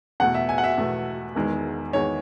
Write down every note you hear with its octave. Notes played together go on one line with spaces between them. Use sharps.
E2 B2 A3 F#5
E5
G#5
F#5
E5
E2 B2 A3
E1 E2 D#3 G#3
E2 D#3 G#3 C#5